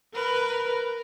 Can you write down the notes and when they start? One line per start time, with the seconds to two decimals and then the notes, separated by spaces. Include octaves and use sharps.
0.15 A#4 B4